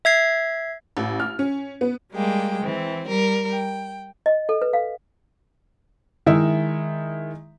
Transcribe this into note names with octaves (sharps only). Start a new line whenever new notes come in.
E5 G#6 C7
A1
F6
C#4
B3
G3 G#3 A#3 G5
E3 C4
G3 A#4
G5
D#5
A4
B4
F5
D#3 G#3 E4 E5